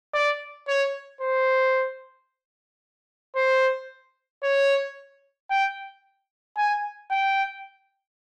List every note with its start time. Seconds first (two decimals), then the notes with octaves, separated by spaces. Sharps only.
0.14 D5
0.68 C#5
1.21 C5
3.36 C5
4.43 C#5
5.50 G5
6.57 G#5
7.11 G5